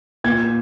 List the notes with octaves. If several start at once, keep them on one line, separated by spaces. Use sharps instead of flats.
A#2 G#6